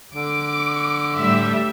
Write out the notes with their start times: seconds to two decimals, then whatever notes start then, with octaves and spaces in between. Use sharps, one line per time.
0.14 D3 D6
1.16 A2 G3 E5